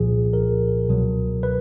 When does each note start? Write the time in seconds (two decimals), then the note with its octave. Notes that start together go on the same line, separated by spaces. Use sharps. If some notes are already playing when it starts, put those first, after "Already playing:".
Already playing: C2 A#2 F3 G#4
0.33 A#4
0.89 C#2 B2 F#3
1.43 B4